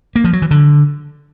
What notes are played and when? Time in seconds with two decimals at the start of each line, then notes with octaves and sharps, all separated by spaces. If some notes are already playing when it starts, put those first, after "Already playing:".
0.16 A#3
0.24 F3
0.33 F#3
0.42 E3
0.51 D3